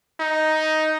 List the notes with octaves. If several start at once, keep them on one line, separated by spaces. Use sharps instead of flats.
D#4